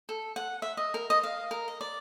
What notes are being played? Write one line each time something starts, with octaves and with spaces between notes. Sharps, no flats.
A4
F#5
E5
D#5
A#4
D#5
F5
A#4
D#5
D5